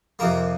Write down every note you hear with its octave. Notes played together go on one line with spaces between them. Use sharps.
F2 C3 F3 A#3 A#4